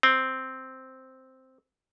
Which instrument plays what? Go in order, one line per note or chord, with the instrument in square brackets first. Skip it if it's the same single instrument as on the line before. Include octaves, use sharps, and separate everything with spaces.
[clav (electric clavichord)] C4